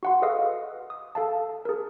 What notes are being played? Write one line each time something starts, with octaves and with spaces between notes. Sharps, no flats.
F#4 F#5 C6
G#4 A4 B4 D#5 F5 D#6
D#6
A4 F5 A5
G#4 A#4